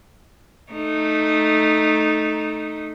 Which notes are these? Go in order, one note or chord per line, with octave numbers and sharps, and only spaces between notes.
A3 D#4